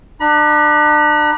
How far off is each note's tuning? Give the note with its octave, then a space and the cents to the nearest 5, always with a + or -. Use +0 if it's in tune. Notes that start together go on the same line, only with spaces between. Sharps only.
D4 +35 B5 -40